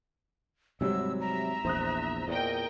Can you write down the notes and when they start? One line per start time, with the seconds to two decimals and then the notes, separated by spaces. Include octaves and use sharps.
0.81 G#1 C3 F#3 G3 E6
1.21 E5 A#5
1.65 A#1 E2 C5 D#6 F#6
2.28 E2 A#2 A#4 D#5 G5